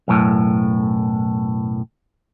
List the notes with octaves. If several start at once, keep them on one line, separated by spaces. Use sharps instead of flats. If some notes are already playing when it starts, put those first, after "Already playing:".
B1 F#2 A2